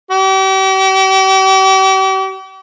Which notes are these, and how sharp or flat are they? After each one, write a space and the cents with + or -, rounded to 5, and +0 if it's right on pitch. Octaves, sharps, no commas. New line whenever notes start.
G4 -40